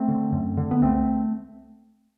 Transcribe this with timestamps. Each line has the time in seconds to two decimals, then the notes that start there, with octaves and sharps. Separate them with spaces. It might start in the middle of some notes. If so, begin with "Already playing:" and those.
Already playing: A3 C4
0.08 D3
0.32 F#2
0.57 D3
0.71 B3
0.82 C2 A3 C4